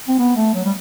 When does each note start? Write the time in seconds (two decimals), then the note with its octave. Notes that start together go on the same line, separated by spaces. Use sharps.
0.08 C4
0.19 B3
0.36 A3
0.54 F#3
0.65 G3